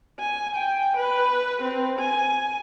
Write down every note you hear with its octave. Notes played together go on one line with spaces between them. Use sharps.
G#5
G5
B4
C4
G#5